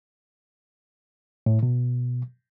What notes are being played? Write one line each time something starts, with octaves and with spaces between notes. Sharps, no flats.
A2
B2